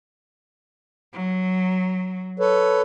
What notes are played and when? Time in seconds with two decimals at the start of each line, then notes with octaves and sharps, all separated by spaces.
1.14 F#3
2.39 A4 B4 C#5